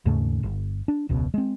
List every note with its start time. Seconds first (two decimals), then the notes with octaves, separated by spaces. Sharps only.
0.06 D#2 G#2 C#3 A3
0.43 G1
0.88 D4
1.09 E1 C#2 B2
1.34 G#3 C4